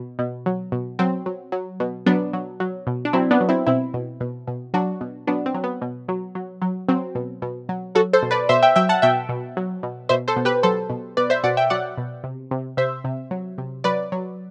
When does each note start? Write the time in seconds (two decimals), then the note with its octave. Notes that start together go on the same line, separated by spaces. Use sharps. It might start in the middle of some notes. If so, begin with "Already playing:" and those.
Already playing: B2
0.19 B2
0.46 F#3
0.72 B2
0.99 F#3 C4
1.26 F#3
1.52 F#3
1.80 B2
2.06 F#3 B3 D4
2.33 F#3
2.60 F#3
2.87 B2
3.05 D4
3.13 F#3 C4 E4
3.31 B3 D4
3.41 F#3
3.49 C4 E4
3.66 B2 C4 E4
3.94 B2
4.20 B2
4.47 B2
4.74 F#3 D4 F#4
5.01 B2
5.27 F#3 B3 D4
5.46 C4
5.54 F#3
5.64 B3
5.82 B2
6.08 F#3
6.35 F#3
6.62 F#3
6.88 F#3 C4
7.15 B2
7.42 B2
7.69 F#3
7.95 F#3 F#4 A4
8.13 A4 C5
8.22 B2
8.31 B4 D5
8.49 B2 C5 E5
8.62 E5 G5
8.76 F#3 E5 G5
8.89 F#5 A5
9.02 B2 E5 G5
9.29 B2
9.57 F#3
9.83 B2
10.09 B2 C5 E5
10.28 A4 C5
10.36 B2
10.45 G4 B4
10.63 F#3 A4 C5
10.90 B2
11.17 B2 B4 D5
11.30 C5 E5
11.44 B2 D5 F#5
11.57 E5 G5
11.70 F#3 D5 F#5
11.98 B2
12.24 C3
12.51 C3
12.77 C3 C5 E5
13.04 C3
13.31 F#3
13.58 C3
13.84 F#3 B4 D5
14.12 F#3